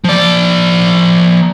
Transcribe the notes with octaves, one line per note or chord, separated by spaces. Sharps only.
F3 D5